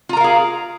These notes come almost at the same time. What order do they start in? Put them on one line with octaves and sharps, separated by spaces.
F4 A#5 A#4 F5 G#4